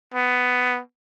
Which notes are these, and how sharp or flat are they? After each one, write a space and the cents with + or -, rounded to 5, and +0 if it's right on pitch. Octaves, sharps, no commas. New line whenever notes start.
B3 +10